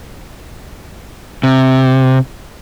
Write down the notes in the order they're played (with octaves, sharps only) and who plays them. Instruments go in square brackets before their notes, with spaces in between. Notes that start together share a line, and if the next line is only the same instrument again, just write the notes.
[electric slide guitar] C3